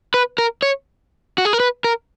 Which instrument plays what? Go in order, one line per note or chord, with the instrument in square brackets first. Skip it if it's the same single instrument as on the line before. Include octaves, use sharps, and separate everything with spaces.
[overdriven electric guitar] B4
A#4
C#5
F#4
G#4
A#4
B4
A#4